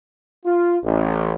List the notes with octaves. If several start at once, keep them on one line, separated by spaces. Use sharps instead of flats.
F4
A1